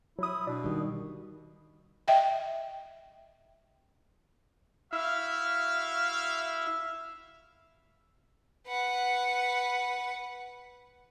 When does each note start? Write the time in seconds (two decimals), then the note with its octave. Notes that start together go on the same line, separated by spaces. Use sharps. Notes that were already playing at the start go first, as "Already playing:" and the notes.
0.19 F#3 E4 D#6
0.47 B2 D4
0.64 D#3 G3
2.08 D#5 E5 G5
4.93 E4 F#4 E5 F5
8.66 B4 F#5